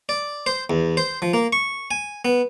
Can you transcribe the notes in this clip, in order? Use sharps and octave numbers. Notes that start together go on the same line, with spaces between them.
D5
C5
E2
C5
F3
A#3
C#6
G#5
B3